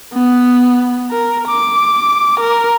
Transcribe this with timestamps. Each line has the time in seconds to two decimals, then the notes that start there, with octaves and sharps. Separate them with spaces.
0.13 B3
1.11 A#4
1.48 D6
2.40 A#4